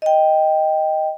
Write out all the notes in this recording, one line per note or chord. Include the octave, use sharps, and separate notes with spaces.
D#5 G5